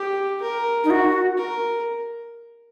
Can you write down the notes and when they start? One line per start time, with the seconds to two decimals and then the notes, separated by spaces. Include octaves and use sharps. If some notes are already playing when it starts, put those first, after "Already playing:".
Already playing: G4
0.42 A#4
0.84 D#4
0.90 F#4
1.37 A#4